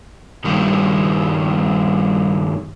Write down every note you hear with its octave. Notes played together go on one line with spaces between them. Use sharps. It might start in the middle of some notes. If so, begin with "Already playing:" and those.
G2 D#3 G3